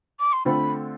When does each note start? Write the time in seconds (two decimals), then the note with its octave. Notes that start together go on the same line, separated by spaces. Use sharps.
0.19 D6
0.32 C6
0.45 D3 A3 C4 F4 A4 B5